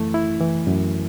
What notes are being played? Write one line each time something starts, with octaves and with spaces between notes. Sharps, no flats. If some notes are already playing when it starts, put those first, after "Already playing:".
Already playing: F#2 E3 A3 E4
E4
E3
F#2